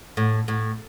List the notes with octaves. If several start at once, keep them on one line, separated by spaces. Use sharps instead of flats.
A2
A2